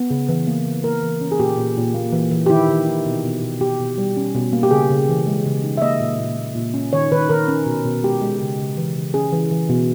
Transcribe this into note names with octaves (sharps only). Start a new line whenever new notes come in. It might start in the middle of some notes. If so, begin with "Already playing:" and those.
Already playing: B3
C#3
E3
A#3
C#3
A#3 A#4
E3
C#4
G#4
A#2 G4
A#2
A#2
A#3
E3
E3
G4
D#3 E4
D#3
D#4
B2
B2
B2
B2 G4
B2
G3
C#4
B2
A#3
G4
C#3 G#4
C#3
E3
G#3
C#3
D#4
E5
A#3 D#5
A#2
A#2
A#2
A#2
C#4
D#3 C#5
D#3 B4
D#3 A#4
C#4
B2
B2
G#3 G4
G#3
C#3
C#3
E3
C#3
C#4 G#4
E3
E3
B2